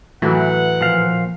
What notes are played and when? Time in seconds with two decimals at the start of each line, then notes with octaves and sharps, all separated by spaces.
0.22 A2 E3 F#3 F#4 F#5
0.81 A#2 F3 F5